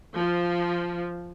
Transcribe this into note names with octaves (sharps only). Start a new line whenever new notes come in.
F3